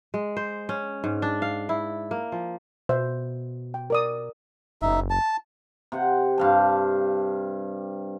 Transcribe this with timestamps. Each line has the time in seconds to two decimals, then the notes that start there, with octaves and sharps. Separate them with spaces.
0.14 G#3
0.37 C5
0.69 C#4
1.04 G#2
1.22 D4
1.42 F5
1.69 E4
2.11 A#3
2.32 F3
2.89 B2 C5 E5
3.74 G5
3.90 A#4 D5 D#6
4.82 F#1 D#4 E5
5.10 A5
5.92 C3 F#5
6.38 G2 F5 A5